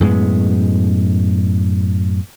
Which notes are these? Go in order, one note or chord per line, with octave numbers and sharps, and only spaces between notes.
F#2 A2 G#3 B3